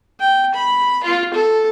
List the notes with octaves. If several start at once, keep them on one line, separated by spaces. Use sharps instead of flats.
G5
B5
F4
A4